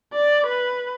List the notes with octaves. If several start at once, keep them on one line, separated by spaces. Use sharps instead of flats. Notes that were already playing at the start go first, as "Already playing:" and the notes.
D5
B4